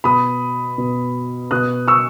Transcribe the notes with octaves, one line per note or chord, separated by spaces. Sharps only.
B2 B5 D#6
B2
B2 D#6 F#6
C#6 E6